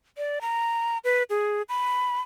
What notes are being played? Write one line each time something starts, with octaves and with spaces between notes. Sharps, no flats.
D5
A#5
B4
G#4
B5